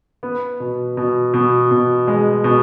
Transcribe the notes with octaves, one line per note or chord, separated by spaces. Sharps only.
B3
B2
B2
B2
B2
G#3
B2